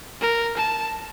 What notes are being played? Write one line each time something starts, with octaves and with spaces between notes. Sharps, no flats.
A#4
A5